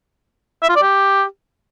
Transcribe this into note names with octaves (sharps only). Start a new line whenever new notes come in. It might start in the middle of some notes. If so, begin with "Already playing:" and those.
E5
F4
D5
G4